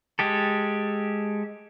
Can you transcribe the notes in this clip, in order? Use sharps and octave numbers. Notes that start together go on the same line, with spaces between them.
G#3 G4 A4